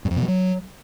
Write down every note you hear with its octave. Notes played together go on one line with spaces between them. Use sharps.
G2
F2
B2
F3
F#3